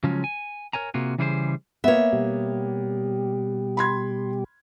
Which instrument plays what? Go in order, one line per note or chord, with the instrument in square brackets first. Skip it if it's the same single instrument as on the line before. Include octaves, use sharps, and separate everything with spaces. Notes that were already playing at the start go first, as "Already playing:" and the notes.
[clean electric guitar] C#3 F3 F#3 G#3 C#4
G#5
A#4 C#5 G#5 A#5
C3 A#3 F4 F#4 G#4
C#3 E3 G3 G#4 A#4 C5
[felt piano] A#3 B3 [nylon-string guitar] C#5 E5
[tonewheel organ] B2 G3 G4
[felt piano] B5 C6 G#6